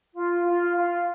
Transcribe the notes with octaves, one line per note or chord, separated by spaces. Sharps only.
F4
F4
F4